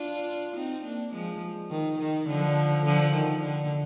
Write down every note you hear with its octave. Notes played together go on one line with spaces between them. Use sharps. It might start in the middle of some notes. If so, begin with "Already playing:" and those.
Already playing: D4 F4
C4 D#4
A#3 D4
F3 G#3
D#3
D#3
D3 F3
D3 F3
D#3
D3